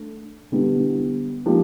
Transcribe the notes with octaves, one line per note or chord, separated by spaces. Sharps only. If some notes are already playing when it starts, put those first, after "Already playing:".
Already playing: A3 D4
D3 G3 B3 E4
C#3 F3 A#3 D#4 G4